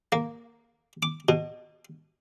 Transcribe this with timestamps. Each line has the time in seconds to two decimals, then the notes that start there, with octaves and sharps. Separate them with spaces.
0.12 A#3
1.03 D6
1.29 B2